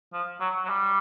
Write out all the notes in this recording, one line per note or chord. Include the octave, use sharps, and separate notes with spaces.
F3
F#3
F#3
G3